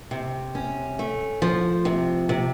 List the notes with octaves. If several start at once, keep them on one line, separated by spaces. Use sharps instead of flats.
C3
C#4
A3
F3
C3
C3